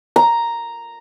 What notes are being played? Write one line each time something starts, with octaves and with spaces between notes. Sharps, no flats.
A#5